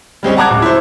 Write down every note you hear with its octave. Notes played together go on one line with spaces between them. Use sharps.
G3 G#3 C4 C#4
F#5 A5 A#5 D6 F#6 G#6
D1
E4 C5